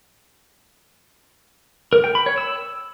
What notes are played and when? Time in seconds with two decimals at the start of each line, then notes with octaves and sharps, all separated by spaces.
1.93 A#4
2.04 G5
2.15 B5
2.26 C#5
2.38 E6